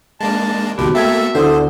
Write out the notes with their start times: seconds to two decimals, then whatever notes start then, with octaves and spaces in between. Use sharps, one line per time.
0.21 G#3 A#3 D4 A5
0.78 C#2 A#2 D#3 B3 F#4 G4 A5
0.95 A3 A#3 A4 E5 G5 G#6
1.35 D2 D3 E4 C5 D#6